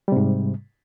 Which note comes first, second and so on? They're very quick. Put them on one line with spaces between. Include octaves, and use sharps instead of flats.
G3 C3 G#2